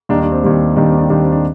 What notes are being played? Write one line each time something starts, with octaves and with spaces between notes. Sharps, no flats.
D#2 D#3 G3 D4
D4
C4
D#2 D#3 G3
D#2 D#3 G3 D4
C4
D4
D#2 D#3 G3 D4
C4
D4